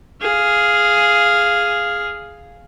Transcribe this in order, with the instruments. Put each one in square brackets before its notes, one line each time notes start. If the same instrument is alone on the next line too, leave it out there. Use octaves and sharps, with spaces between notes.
[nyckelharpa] G#4 F5